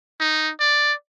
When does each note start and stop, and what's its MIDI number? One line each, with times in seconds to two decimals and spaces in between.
0.20 0.50 63
0.60 0.93 74